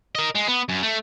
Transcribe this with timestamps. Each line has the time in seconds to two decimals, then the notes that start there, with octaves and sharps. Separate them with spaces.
0.15 A#4 D#5
0.35 G#3
0.48 B3
0.69 F#2
0.83 A3